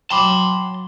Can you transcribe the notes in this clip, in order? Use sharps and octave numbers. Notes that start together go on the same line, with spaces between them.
F#3 G5 A5 B5 C6 D6